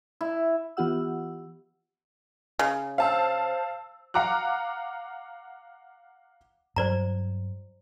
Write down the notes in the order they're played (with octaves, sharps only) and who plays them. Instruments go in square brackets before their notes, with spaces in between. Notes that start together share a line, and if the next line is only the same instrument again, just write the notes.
[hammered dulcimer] E4
[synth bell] E3 B3 F4 G4 F#5 E6
[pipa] C#3
[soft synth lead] C5 [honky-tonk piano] F5 A5 E6
[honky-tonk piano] F5 F#5 A#5 D6 F#6
[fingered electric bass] G2 F#3 [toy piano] C5 D5 A#5